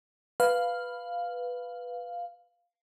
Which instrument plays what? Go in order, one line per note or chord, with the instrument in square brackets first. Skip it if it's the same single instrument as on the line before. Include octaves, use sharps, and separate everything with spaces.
[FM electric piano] B4 F5